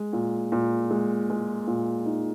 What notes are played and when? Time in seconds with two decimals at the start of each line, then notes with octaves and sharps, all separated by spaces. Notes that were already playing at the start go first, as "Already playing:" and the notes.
Already playing: G#3
0.13 A#2
0.52 A#2
0.91 G#3
1.30 G#3
1.67 A#2
2.06 D#4